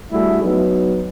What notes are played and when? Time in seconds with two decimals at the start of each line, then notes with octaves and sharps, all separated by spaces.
0.12 G3 A3 D4 E4 F#4 G#4
0.42 F#3 B3 D#4